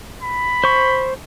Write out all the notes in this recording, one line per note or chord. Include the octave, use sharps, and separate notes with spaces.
B5
C5 C#6